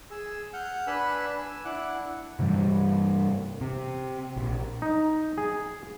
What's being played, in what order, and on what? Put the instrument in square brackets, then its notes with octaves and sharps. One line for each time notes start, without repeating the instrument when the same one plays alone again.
[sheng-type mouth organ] G#4 E6
F#5 F6 G6
D4 B4 G#5 B5 E6 F#6
G#5 E6
D4 E4 F#5 D6 F#6
[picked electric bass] G2 C3 E3 G3
C3
A#1
[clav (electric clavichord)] D#4
G#4